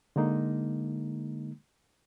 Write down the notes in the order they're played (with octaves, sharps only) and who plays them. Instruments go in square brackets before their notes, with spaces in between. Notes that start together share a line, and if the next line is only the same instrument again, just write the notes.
[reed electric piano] D3 G#3 A#3 D#4